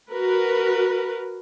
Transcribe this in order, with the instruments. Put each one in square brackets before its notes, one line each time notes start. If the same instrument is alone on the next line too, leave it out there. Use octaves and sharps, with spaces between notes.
[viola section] F#4 A#4 B4